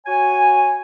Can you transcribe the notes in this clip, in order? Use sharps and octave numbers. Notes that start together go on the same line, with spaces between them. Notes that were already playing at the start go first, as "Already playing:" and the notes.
F#4 C#5 G#5